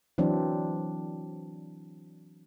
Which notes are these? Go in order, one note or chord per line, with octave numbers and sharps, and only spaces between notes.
E3 F#3 C4 D4